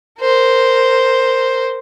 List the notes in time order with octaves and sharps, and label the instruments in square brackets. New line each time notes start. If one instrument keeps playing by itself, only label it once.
[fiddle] A#4 C5